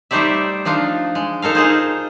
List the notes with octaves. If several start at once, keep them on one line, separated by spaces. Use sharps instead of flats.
G3 A3 D#4 C5 D5 E5
F3 D4 D#4 F4
G#3
D#4 A4 A#4 F5
D#4 G#4 C5